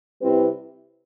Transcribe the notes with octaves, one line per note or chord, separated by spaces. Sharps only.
C3 G3 C4 E4 B4